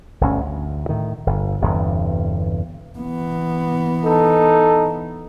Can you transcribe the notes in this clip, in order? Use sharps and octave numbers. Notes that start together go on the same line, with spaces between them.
G1 D2 C#4
D2
A2 D#3
G1
G1 E2 G2 C3
E3 B3
D#4 A4